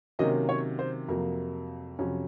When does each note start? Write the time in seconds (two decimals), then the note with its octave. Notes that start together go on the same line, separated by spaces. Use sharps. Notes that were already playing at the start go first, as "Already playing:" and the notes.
0.19 C3 D#3 F#3 A#3 C#4 D#5
0.49 C#5
0.79 C5
1.08 F2 C3 F#3 A#3 A#4
1.99 F2 C3 F#3 C#4